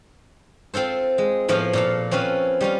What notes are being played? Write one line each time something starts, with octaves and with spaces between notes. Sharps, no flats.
C4 F4 A4 C5
G#3
A2 F3 B3 F4 C5 F5
A#2 A4 F5
C4 C#4 F4 B4
G3 C#4 F4